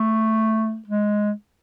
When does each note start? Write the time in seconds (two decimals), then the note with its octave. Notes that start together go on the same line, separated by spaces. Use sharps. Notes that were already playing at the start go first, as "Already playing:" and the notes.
Already playing: A3
0.88 G#3